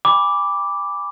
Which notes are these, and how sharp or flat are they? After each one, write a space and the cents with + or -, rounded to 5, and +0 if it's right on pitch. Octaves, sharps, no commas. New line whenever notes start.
G#5 -45 B5 +0 D6 -5